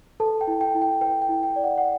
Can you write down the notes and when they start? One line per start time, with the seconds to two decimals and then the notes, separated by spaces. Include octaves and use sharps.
0.20 A4 B4 A5
0.41 G5
0.47 E4
0.61 G5
0.75 E4
0.82 G5
1.01 B4 G5
1.22 G5
1.29 E4
1.43 G5
1.56 D5
1.64 F#5
1.78 F#5